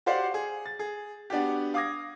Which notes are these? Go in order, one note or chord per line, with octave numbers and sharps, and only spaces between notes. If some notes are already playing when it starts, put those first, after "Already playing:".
F#4 G4 C5 D5 F5 F#5
G#4
A6
G#4
B3 D4 F#4 G4
F5 D6 D#6 G#6 A#6